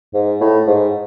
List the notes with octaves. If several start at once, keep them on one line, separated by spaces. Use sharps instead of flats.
G#2
A2
G#2